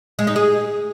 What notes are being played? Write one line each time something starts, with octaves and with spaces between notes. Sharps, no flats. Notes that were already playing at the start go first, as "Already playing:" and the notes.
G#3
D#4
G#4